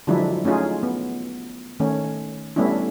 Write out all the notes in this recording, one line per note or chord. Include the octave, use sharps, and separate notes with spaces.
D3 F3 F#3 G#3 D4 E4
A3 C#4 D#4 F4 G#4
B3
D#3 A3 C#4
G3 A3 B3 C#4 D4 E4